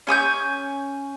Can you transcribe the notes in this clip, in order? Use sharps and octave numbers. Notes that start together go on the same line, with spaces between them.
C#4 G#5 D#6 G6